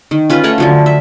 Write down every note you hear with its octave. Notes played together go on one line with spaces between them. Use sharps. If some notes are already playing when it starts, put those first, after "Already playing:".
D#3
C#4 F4 B4
A3 A#4 C#5 F#5
D3 F3 F#3
E5